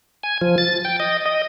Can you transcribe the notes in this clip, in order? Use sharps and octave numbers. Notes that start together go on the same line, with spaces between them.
G#5
F3
A6
G5
D#5
D#5